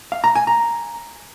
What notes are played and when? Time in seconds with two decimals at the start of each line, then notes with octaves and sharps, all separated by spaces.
0.12 F5
0.24 A#5
0.35 G#5
0.47 A#5